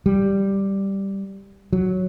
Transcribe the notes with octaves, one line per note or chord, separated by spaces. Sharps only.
G3
F#3